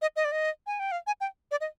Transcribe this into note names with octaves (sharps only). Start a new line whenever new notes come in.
D#5
D#5
D5
D#5
G#5
G5
F5
G#5
G5
D5
D#5